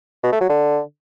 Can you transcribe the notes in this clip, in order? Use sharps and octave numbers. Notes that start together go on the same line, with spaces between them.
B2
A3
F#3
D3